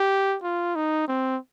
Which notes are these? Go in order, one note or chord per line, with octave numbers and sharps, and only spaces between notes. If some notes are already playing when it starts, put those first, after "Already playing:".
Already playing: G4
F4
D#4
C4